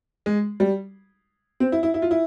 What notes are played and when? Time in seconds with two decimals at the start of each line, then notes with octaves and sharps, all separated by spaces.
0.26 G#3
0.60 G3
1.60 C4
1.72 E4
1.83 E4
1.94 E4
2.02 F4
2.11 E4